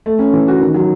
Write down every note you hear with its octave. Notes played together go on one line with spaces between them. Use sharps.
A3
C#4
E3
F#4
D#3
F#3